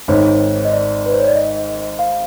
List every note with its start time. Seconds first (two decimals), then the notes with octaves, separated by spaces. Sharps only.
0.08 G#1 G#2 D#3 C#5
0.65 D#5
0.72 D5
1.06 B4
1.13 C5
1.20 C#5
1.28 D5
1.35 D#5
1.99 F5